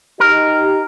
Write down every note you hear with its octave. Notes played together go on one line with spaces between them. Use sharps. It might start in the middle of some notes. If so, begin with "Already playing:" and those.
D#4 G4 A#4 D#5